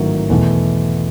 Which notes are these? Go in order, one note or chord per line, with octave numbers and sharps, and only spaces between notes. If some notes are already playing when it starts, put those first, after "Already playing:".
Already playing: A1 G#2 D#3 F#3
E2 B2 A3